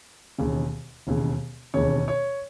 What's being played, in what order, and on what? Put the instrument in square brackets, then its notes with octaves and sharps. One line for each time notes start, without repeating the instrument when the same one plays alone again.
[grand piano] E1 D#2 C#3
E1 D#2 C#3
E1 D#2 C#3 C#5
C#5